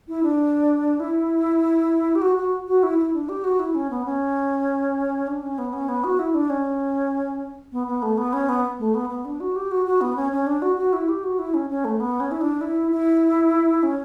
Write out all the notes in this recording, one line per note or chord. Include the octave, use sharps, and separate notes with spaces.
E4
D4
E4
G4
F#4
F#4
F#4
E4
E4
D4
G4
F#4
E4
C#4
B3
C#4
D4
C#4
B3
C#4
B3
F#4
E4
D4
C#4
B3
B3
A3
B3
C#4
B3
A3
B3
B3
D4
F#4
G4
F#4
F#4
B3
C#4
C#4
D4
F#4
F#4
E4
G4
F#4
E4
C#4
C#4
A3
B3
C#4
E4
D4
E4
E4
C#4